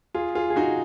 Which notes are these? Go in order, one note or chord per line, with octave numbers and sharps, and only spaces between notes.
F4 G#4
F4 G#4
G#4
D#4 F#4